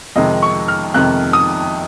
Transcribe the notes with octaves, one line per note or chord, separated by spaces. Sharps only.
F2 C3 D#3 G#3 D#4 D#5
C#6
F6
F2 C3 D#3 G#3 D#4 F#6
D#6